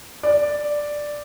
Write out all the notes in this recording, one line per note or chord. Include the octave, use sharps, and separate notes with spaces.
D5